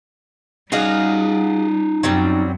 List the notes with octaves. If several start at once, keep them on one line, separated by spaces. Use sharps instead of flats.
G3 C#4 D#4 F#4 G#4 D#5 F5
F#2 F#3 G3 C4